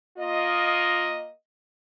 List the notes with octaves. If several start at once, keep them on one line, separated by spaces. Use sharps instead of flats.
A#3 F4 D#5